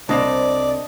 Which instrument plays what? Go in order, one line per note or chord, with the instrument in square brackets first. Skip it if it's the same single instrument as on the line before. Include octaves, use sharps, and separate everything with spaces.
[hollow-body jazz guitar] C2 C4 A#5 [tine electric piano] D4 D#5 [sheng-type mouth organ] D5